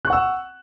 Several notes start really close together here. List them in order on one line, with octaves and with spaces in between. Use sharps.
F#6 C#6 F#5 E6